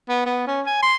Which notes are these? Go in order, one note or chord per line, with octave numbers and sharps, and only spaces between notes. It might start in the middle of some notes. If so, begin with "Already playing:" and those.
B3
B3
C#4
G#5
C6